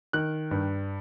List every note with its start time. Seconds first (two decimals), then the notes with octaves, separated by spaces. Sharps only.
0.13 D#3 F#6
0.51 G2